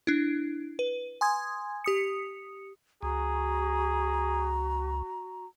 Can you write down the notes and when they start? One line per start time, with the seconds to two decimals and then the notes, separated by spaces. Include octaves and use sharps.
0.07 D4 E4
0.79 B4
1.21 G#5 C6 D#6 G#6
1.84 G4 D#6 C#7
3.03 C#2 F#4 G#4 A#5